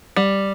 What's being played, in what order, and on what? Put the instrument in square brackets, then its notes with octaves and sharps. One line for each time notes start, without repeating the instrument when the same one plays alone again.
[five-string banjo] G3